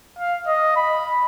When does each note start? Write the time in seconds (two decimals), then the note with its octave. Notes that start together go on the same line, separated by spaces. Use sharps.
0.19 F5
0.47 D#5
0.76 B5